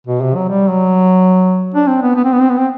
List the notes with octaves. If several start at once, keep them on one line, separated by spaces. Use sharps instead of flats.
B2
C3
F#3
G3
F#3
D4
C4
B3
B3
C4
B3
C4
B3
C4